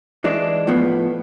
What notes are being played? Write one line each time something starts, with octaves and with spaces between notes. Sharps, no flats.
E3 G#3 D4
A2 F3 B3